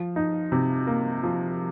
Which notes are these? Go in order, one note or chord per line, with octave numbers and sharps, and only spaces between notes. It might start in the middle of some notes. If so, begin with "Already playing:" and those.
Already playing: F3
D#4
C3
A#3
F3